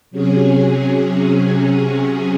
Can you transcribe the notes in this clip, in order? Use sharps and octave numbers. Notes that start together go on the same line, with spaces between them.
C3 F#3 C#4 G#4